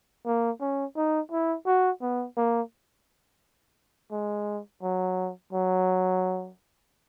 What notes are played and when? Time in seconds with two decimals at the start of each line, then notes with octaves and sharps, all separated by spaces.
0.26 A#3
0.61 C#4
0.96 D#4
1.31 E4
1.66 F#4
2.01 B3
2.37 A#3
4.12 G#3
4.82 F#3
5.53 F#3